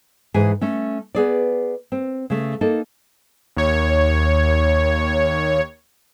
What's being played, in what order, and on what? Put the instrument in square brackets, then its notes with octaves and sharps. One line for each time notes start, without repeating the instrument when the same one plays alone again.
[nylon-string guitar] G#2 E3 G#4 G#5
A3 C#4
B3 G#4 D5
C4
C#3 A3
A#3 D#4 A4
[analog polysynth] D#2 C#5